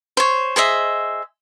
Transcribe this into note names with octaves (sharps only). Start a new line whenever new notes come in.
C5 C#5
G#4 C5 D#5 E5